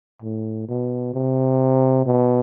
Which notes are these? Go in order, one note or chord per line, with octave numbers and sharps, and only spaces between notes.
A2
B2
C3
B2